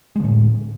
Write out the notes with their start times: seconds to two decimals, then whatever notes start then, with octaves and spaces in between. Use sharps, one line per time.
0.16 G#3
0.20 D3
0.24 A2